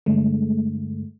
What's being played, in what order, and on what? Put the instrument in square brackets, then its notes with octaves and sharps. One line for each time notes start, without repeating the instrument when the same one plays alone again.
[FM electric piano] G2 D3 G#3 A3